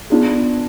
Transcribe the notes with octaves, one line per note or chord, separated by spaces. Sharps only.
B3 D4 F4 G#4